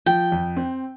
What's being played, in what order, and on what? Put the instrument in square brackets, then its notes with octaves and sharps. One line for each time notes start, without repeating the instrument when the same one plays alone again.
[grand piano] F3 [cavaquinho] G5
[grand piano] F2
C4